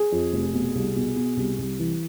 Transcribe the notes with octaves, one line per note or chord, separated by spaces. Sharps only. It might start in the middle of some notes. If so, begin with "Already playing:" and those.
Already playing: G#4
F2
F1
B2
C2
B2
B2
C2
C2
E3